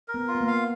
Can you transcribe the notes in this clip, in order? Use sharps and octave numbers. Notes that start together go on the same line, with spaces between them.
A#4
B3
F4
B3
A#3
F5